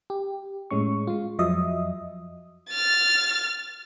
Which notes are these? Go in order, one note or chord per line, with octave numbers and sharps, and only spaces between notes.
G4
A2 G#3 C#4 C#6
G#3 F4
F2 F3 F#3 D#5 E5 D#6
F6 A6